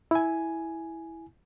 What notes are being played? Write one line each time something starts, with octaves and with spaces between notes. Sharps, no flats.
E4 G#5